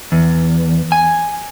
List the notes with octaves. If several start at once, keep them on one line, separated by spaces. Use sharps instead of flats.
E2
G#5